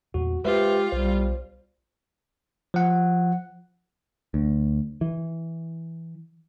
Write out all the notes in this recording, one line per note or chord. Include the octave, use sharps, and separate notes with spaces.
E2 A#2 F#4
G#3 F4 G4 B4 C5 E5
B1 G3 C5
F3 F#5
D2
E3